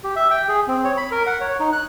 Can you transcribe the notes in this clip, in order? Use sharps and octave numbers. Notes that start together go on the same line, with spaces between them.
G4
E5
G5
G#4
C4
C#5
B5
A#4
F#5
C#5
D#4
F#6